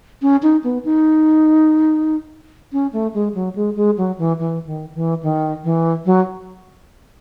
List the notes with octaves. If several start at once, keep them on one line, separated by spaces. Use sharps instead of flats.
C#4
D#4
B3
D#4
C#4
A3
G#3
F#3
G#3
G#3
F#3
E3
E3
D#3
E3
D#3
E3
F#3